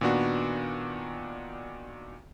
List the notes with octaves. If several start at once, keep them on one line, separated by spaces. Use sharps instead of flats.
A#2 D#3 B3 D4 F#4